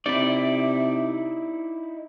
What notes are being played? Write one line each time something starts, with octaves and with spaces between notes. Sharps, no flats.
C3 D#4 E4 D5